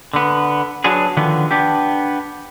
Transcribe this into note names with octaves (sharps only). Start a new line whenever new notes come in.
D3 B3
F#3 B3 D4 G#4
D3 D#3 F3 B3
B3 D4 G4